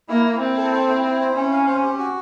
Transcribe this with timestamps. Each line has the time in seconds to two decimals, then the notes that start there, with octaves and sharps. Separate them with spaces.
0.09 A#3 E4
0.24 E4
0.41 C4 E4
0.57 A4
0.73 C5
0.88 E4
1.03 E4
1.20 C5
1.35 C#4 E4
1.51 F5
1.67 C5
1.83 G4
1.99 F#4